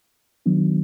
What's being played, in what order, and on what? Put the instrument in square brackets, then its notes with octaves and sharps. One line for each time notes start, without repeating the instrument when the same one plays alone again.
[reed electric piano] D#3 F#3 B3 D4